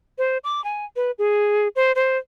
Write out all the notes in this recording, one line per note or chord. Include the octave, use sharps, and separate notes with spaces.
C5
D6
G#5
B4
G#4
C5
C5